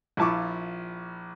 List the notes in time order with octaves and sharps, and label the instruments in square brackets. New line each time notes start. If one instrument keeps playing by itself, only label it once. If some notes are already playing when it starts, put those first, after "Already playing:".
[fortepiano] A#1 E4 F4 A5 C#6 D6